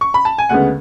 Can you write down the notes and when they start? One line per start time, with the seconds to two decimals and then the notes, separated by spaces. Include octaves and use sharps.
0.01 C#6
0.14 B5
0.25 A5
0.38 G#5
0.49 D2 C#3 G#3 B3 F#5